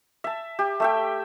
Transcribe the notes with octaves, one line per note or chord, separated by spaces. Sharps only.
E5 A5
G4
A3 E5 G5